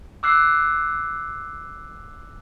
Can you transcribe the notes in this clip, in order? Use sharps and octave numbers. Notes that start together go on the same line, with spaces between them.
D6 E6 F#6 C7